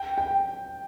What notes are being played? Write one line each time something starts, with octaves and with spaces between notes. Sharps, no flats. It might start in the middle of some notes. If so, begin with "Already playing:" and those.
Already playing: G5
G5